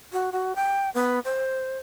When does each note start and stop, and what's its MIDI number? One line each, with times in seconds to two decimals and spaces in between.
0.12 0.30 66
0.32 0.55 66
0.56 0.90 79
0.94 1.19 59
1.25 1.78 72